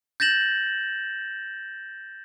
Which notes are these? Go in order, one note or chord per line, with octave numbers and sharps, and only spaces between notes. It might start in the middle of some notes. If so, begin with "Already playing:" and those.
G6 A6 A#6 E7 F#7